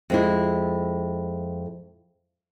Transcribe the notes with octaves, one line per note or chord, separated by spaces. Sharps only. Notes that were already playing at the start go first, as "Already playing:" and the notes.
F2 G#3 E4